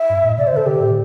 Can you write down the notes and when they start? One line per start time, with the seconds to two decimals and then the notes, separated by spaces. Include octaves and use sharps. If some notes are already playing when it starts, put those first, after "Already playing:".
Already playing: E5
0.09 G2
0.23 A2
0.37 C3 D5
0.47 C5
0.53 D3 A4
0.66 D3 G4
0.80 A2